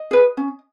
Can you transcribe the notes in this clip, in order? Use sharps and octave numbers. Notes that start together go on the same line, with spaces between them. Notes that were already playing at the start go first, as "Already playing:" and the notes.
Already playing: D#5
G#4 B4
C#4